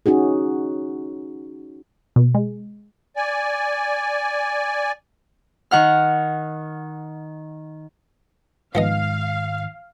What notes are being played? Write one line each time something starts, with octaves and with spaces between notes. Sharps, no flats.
C#4 D#4 F#4 G#4
B2
G#3
D5 G#5
D#3 F#5 F6
G#2 D#3 F3 B3 D#5 F5